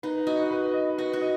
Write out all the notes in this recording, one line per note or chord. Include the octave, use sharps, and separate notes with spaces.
D#4 B4
F#4 D#5
B4
D#5
F#4 B4
F#4
D#5